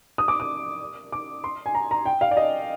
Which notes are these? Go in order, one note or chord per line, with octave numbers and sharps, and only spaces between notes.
D#6
D6
D#6
D6
C6
G#5
A#5
A#5
G5
F5
D5
D#5